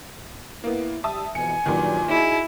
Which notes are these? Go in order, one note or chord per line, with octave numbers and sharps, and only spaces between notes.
A#3 B3 E4
G3 E5 A5 D#6
F2 B2 E3 G#5 C#7
G2 A#2 D#3 F#3
D#4 E4 F#4 G#4